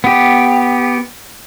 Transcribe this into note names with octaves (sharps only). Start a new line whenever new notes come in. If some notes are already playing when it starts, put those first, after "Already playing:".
B3 G4